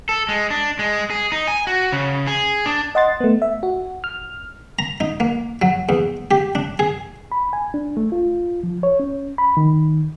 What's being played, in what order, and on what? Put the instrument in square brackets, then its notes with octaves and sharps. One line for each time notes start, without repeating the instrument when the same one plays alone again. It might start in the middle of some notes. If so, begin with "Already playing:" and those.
[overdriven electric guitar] A4
G#3
D4
G#3
G#4
D#4
G#5
F#4
C#3
G#4
D4
[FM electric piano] D#5 F#5 C6 A6
A3 B3
E5
F#4
F6
[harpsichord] A#5
D#4
A#3
F#3
E2
G4
D4
G#4
[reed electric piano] B5
G#5
D4
A3
F4
F3
C#5
C#4
B5
D#3